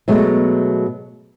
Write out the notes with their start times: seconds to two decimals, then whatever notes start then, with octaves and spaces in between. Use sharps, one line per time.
0.08 B2 F#3 G#3 A3